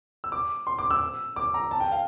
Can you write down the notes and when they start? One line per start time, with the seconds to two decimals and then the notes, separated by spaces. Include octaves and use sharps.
0.24 E6
0.32 D6
0.67 C6
0.78 D6
0.91 E6
1.36 D6
1.54 A#5
1.71 A5
1.80 G5
1.92 F5